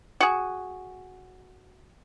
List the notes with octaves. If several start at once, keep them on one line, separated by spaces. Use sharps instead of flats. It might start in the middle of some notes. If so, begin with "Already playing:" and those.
F#4 G#4